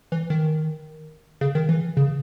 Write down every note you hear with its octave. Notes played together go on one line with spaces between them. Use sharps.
E3
D#3
C#3
D#3
E3
C#3